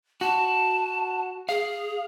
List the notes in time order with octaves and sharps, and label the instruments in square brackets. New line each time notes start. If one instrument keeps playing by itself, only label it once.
[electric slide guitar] F#4 [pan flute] A5
[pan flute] G#4 [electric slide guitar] F5